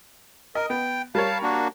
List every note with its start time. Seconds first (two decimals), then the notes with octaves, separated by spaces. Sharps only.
0.55 A#4 D#5
0.70 B3 G5
1.15 G3 A#4 C#5 F5 A5
1.43 A#3 D4 F#4